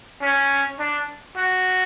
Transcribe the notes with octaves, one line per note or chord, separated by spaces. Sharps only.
C#4
D4
F#4